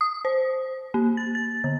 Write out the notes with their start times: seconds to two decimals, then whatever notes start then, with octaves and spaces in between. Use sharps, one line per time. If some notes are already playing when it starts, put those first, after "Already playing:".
0.01 D#6
0.25 C5
0.94 A#3
1.17 A6
1.35 A6
1.64 D3